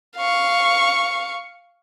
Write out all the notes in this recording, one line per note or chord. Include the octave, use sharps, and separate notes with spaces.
F5 C#6